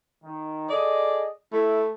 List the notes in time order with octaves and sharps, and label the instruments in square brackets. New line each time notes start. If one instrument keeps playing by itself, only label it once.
[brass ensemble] D#3
[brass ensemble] G#4 A4 D#5 [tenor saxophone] D5
[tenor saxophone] A3 [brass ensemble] E4